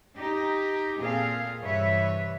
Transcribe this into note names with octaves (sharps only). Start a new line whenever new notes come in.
D#4 G4
A#2 C4 G#4 A4 F5
G2 C3 E3 B4 C#5 E5